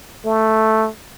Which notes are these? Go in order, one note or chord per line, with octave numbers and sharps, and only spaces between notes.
A3